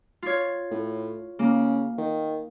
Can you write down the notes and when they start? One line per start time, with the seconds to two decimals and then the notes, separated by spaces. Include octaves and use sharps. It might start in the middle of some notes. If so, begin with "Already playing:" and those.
0.23 F4 C#5
0.71 A2
1.39 C#3 A#3
1.98 D#3